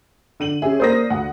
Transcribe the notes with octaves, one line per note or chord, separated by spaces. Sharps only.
D3 D#7 F#7
C#4 G4 G#4 E5
A#3 C5 D5 D#6 A#6
D2 F#5